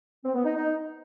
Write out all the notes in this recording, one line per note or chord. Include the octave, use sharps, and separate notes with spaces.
C4
B3
D#4
D#4